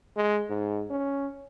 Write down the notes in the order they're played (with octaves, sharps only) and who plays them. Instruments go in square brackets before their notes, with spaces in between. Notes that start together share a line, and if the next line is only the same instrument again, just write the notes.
[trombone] G#3
G#2
C#4